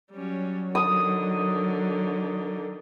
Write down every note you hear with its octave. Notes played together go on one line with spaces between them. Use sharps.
F#3 G3 C#4
D3 D#3 D#6